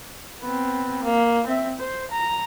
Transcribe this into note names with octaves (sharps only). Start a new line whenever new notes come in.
B3 C4
A#3
C4 E5
C5
A#5